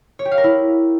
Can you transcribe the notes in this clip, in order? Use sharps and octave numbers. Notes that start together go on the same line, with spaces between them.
C#5
G4
F5
A#4
E4